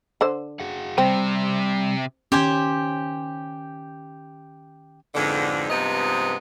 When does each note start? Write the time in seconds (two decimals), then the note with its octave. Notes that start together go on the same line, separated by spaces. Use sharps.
0.21 D3 C5
0.60 F#4 G#4 F#5
0.98 C3 G3 C4
2.32 D#3 C#4 G4 C5 G#5
5.15 F2 G#2 B2 D3
5.70 G2 C3 F3 G#3 B3 D#4